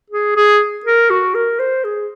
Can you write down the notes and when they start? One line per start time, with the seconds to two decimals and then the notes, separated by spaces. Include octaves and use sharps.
0.10 G#4
0.36 G#4
0.85 A#4
1.10 F#4
1.35 A#4
1.60 C5
1.84 G#4